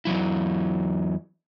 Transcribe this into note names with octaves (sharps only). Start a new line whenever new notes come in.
E2 C#3 F#3 E4